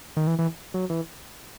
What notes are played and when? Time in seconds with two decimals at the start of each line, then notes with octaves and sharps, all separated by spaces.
0.17 D#3
0.27 E3
0.39 E3
0.74 F#3
0.90 E3